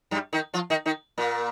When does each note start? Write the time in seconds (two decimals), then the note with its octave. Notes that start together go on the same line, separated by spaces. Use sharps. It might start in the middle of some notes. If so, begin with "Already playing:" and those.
0.11 G2 G3
0.33 D#3 D#4
0.54 F3 F4
0.70 D#3 D#4
0.86 D#3 D#4
1.18 A#2 A#3